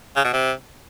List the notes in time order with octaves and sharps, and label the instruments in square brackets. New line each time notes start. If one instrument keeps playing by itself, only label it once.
[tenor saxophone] C#3
B2
C3